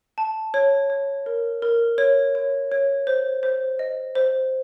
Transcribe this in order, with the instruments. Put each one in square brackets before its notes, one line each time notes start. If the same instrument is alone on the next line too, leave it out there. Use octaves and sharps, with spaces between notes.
[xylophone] A5
C#5
C#5
A#4
A#4
C#5
C#5
C#5
C5
C5
D#5
C5